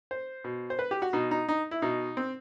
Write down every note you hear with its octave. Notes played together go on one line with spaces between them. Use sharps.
C5
B2
C5
B4
G4
F#4
B2 D#4
D#4
D#4
E4
B2 D#4
C4